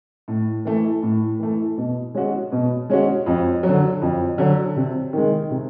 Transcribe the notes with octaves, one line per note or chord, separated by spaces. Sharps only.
A2
E3 A3
A2
E3 A3
B2
G#3 C#4 F#4
B2
G#3 C#4 F#4
F2
F#3
D3
F2
D3 F#3
C3
D#3 G#3
C3